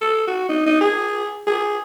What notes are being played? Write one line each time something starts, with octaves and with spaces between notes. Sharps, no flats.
A4
F#4
D#4
D#4
G#4
G#4